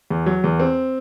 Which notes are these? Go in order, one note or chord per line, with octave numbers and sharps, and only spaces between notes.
E2
F#3
E2
C4